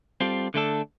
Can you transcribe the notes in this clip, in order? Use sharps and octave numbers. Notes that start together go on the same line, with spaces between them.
G3 C4 F4 A4
D3 A3 D4 A4